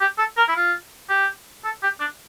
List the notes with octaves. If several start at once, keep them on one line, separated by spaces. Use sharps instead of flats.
G4
A4
A#4
E4
F4
G4
A4
G4
D4